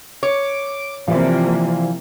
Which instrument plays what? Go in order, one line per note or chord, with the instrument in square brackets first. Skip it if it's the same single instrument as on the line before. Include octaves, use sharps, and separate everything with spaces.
[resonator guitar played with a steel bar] C#5 [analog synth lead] D6
[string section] C3 A#3 [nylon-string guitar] E3 D5 [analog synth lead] F3